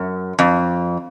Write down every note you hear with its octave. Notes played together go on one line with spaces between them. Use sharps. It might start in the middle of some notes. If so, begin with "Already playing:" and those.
Already playing: F#2
F2